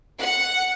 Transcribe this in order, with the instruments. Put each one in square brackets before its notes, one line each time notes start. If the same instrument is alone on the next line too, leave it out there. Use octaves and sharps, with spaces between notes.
[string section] F#5